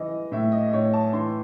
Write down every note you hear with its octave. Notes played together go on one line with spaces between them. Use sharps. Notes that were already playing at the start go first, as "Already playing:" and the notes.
Already playing: E3 D#5
A2 E5
D#5
A2 C#5
A5
E3 C6